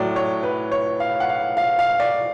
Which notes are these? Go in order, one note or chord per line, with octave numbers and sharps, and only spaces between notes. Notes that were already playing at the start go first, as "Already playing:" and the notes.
Already playing: A2 F#3 D5
C#5
B4
C#5
F5
F#5
F5
F5
F5
D5